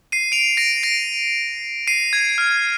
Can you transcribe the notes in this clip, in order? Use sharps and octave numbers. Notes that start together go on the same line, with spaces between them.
C7 D#7
D7 F7
A#6 D7
A#6 D7
C7 D#7
G#6
F6